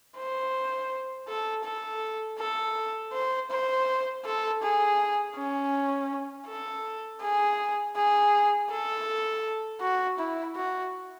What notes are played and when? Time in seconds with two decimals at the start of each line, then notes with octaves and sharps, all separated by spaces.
0.17 C5
1.28 A4
1.64 A4
2.39 A4
3.13 C5
3.51 C5
4.25 A4
4.62 G#4
5.36 C#4
6.48 A4
7.22 G#4
7.96 G#4
8.70 A4
9.81 F#4
10.18 E4
10.56 F#4